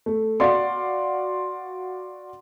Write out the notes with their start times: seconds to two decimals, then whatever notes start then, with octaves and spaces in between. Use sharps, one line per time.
0.06 A3
0.40 F#4 D5 F5 C6